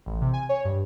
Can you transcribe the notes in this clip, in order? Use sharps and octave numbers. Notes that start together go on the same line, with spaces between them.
A1
C3
G#5
C#5
G2